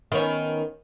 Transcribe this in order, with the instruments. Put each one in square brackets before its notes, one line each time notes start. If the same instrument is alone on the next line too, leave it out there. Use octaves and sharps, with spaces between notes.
[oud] D#3 B3 C#4